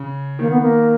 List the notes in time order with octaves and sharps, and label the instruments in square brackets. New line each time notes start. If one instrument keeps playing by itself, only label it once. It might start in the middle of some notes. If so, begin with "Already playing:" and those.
Already playing: [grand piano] C#3
[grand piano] D#3 [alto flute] A#3
[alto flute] B3
A#3